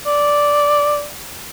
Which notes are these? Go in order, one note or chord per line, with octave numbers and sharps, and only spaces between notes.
D5